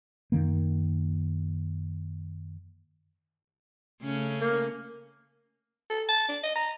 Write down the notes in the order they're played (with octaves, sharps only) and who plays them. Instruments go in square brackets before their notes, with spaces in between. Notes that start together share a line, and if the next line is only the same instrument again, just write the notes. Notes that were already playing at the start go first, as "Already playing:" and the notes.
[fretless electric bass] F#2 D#3 A#3
[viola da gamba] C#3 A3 C#4
[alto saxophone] A#3
[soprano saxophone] A4
A5
D4
D#5
A#5